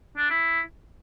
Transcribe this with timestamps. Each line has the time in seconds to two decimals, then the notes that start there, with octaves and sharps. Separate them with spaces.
0.17 D4
0.30 E4